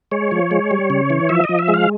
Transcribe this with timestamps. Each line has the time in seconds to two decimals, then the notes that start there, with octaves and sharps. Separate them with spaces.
0.11 G#3 C#5
0.31 F3
0.51 G#3
0.71 G3
0.90 C#3
1.10 E3
1.29 F3 E5
1.44 D#5
1.49 F3
1.59 E5
1.68 G#3
1.74 F5